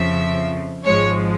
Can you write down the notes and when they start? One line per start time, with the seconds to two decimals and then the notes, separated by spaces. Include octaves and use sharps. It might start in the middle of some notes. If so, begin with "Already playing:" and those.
Already playing: F2 C#3 F3 E5
0.84 G#1 G#2 F3 G#3 C#5